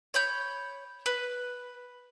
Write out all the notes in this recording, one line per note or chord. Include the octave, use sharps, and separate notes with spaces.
C#5 B5 G6
B4